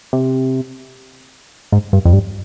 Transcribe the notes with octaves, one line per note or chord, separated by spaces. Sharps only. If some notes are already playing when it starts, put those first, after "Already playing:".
C3
G#2
G2
F2
G2